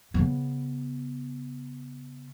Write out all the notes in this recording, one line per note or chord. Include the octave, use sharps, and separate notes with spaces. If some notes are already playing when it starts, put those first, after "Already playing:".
C#3 B3